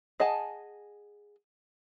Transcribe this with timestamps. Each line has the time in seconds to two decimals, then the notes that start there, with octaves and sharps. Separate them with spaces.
0.20 G#4 D#5 F#5 G#5 A5